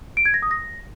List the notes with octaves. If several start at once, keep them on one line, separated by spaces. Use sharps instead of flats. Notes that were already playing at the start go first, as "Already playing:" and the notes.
D7
G#6
A#6
D#6
A#6